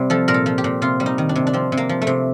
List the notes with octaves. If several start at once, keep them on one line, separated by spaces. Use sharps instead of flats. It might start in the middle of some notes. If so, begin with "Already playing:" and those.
Already playing: C3 G3
F3 A4
A#2 A#4
A4
F3
G4
A#2
C3 F4
G3
D#4
D#3
D4
C3
D4
F3 C4
C3
A#3
F3
A3
C3